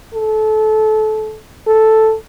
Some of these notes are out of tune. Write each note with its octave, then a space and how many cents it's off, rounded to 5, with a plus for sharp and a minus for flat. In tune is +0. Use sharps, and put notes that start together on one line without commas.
A4 -25
A4 +0